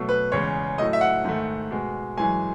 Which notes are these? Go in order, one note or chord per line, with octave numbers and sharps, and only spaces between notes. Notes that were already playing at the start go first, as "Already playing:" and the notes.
Already playing: B2 F#3 A3
B4
E2 C#3 G#3 C#5
A2 F#3 A3 D#5
E5
F#5
G#2 D#3 A3
B2 G#3
F#2 E3 G#3 G#5